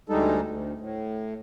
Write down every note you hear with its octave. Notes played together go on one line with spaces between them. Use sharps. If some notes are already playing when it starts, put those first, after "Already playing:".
D2 G3 G#3 D#4 A4
D2
A2